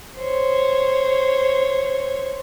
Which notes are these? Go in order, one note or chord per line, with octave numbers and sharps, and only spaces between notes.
C5 C#5